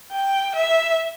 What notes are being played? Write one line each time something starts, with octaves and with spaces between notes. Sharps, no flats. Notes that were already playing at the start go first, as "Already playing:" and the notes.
G5
E5